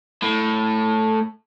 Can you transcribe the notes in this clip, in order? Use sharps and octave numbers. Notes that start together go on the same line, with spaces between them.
A2